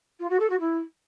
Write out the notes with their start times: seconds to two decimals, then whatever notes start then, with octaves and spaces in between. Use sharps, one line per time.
0.19 F4
0.29 F#4
0.39 A4
0.50 F#4
0.60 E4